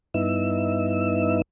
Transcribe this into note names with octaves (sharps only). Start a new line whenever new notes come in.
G2 B3 D#4 E4 E6